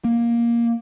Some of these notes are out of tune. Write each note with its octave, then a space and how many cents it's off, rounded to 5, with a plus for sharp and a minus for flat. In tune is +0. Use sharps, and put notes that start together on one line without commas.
A#3 +10